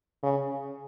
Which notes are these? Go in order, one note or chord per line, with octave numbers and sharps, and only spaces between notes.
C#3